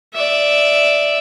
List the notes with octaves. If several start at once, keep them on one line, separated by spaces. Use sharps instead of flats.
D5 E5